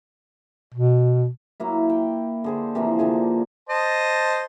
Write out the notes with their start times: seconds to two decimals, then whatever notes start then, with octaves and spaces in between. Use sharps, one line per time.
0.74 B2
1.60 F#3 A#3 E4
1.90 G5
2.44 D3 G#4 C5
2.75 C3 E3 F3 A#3
2.99 A#2 D3 G#4
3.69 C5 D#5 A5